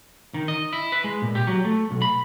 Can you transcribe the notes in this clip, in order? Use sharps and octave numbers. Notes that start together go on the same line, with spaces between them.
D#3
D#5
E4
B4
G#3
A#2
G4
F#3
A3
B1
B5